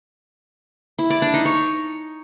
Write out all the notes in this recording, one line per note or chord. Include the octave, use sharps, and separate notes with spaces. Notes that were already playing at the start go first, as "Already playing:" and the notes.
E4
D5
D4
D#4
C#5